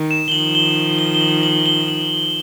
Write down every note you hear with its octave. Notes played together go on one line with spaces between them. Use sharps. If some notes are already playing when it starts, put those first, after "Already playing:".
Already playing: D#3
E7
G7
D#3 F3 F#7
G7
G7
G7
F#7
F#7
G7
F#7